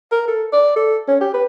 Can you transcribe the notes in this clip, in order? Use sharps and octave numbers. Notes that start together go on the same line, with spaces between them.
A#4
A4
D5
A4
C#4
G4
B4